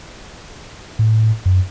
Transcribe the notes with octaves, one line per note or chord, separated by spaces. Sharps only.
A2
F#2